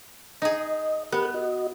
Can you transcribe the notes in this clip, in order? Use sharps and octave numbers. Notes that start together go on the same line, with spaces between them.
D#4 G#4 D#5
B3 G4 A#4 F#6
F#4 D#5